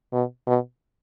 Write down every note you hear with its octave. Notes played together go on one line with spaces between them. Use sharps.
B2
B2